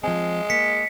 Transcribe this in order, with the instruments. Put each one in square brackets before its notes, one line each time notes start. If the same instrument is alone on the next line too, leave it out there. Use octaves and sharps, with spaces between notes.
[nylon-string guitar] F3 C4 [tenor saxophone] G#3 [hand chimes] G#5
[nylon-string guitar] A#3 [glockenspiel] B6 C#7